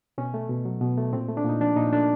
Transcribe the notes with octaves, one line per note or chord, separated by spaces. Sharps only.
B2 C#4
A3
B2
F#3
B2
A3
A#2 C4
A3
D4
A#2 D#4
F3 D4
A#2 D#4
C#4
A3 D4